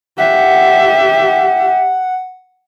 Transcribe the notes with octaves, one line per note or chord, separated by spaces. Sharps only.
G4 E5 F#5